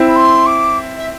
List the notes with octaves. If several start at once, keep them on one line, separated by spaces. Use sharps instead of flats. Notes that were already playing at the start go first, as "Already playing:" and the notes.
Already playing: C4 E4
B5
C6
D6
E5